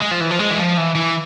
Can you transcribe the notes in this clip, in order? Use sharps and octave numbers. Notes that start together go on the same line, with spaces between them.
G#3
F3
E3
F3
G#3
E3
F3
E3
E3